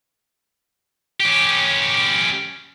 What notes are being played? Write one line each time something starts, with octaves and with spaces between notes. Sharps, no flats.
C#4 G4